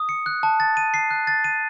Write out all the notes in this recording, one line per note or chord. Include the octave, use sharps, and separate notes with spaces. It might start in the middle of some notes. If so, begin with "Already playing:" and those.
Already playing: D#6
C#7
F#6
A5
A6
D#7
C7
F#6
A6
D#7